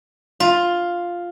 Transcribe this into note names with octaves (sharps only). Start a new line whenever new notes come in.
F4